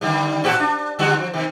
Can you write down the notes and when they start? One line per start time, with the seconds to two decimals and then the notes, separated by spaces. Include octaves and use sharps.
0.01 D3 D#3 G3
0.44 A2 F#4 G4
0.60 D4
0.99 D3 G3 F#4
1.19 F3
1.34 C3 D#3